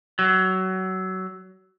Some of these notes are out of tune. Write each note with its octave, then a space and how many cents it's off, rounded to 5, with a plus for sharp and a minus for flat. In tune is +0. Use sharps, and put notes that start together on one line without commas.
F#3 +20